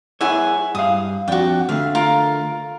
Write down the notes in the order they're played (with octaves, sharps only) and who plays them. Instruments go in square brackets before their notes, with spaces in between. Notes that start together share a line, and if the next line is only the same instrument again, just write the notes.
[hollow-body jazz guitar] E4 G#4 C#5 [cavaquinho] E5 F#5 G#5
[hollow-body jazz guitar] G2 F5 [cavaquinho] D#6
[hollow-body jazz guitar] F2 D4 [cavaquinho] F#4 G5
[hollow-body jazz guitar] D3 A3 [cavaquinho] F5
[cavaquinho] F4 A#4